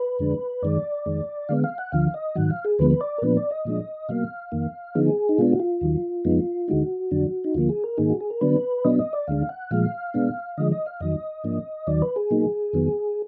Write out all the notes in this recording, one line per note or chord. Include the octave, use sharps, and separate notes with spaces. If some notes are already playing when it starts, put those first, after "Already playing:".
Already playing: B4
F2 D3 G#3 D4
F#2 D#3 G#3 D5
F2 D#3 G#3
D3 G#3 B3 F5
F5
F#5
D2 D3 F3 F5
D#5
G#2 D#3 F#3 F#5
F5
G#4
D2 D3 F3 G#3 B3 B4
B4
D5
A#4
A#2 F3 B3 D4 B4
D5
D#5
A#2 F3 G#3 D4
B2 F#3 A#3 F5
F2 D#3 A#3
D3 F3 B3 D#4 G#4
D#4
B2 G#3 B3 D4 F4
F#4
F4
D#2 D#3 F#3
F2 F3 G#3 B3 D#4
D2 D3 G#3 D#4 F#4
F2 D3 F#3 D4
D#4
D2 D3 F3 A#3 F4
G#4
A#4
G#2 D#3 A#3 D#4 G#4
F#4
G#4
A#4
D3 F#3 B3 D4 B4
B2 F#3 B3 D4 D#5
D#5
D5
D2 D3 G#3 D4 F5
F#5
A#2 F3 G#3 F5
B2 G#3 B3 D4
D3 F3 G#3 D#5
D#5
F5
F2 D#3 F#3 D#5
G#2 F3 A#3 D4
D#2 D#3 F#3 D5
B4
G#4
B2 F#3 A#3 D#4
F2 D#3 F#3 B3